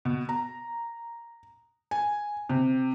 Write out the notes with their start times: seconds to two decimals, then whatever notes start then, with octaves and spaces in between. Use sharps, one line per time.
0.05 B2
0.29 A#5
1.91 G#5
2.50 C3